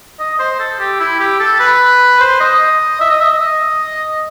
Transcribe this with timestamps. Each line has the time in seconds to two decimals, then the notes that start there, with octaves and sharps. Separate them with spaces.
0.20 D#5
0.39 C5
0.60 A4
0.80 G4
1.00 E4
1.20 G4
1.40 A4
1.60 B4
2.20 C5
2.40 D#5
3.01 E5
3.11 D#5
3.21 E5
3.31 D#5